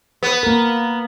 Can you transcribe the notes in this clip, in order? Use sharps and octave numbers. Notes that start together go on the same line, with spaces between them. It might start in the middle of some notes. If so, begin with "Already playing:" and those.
B3
A#3 A#4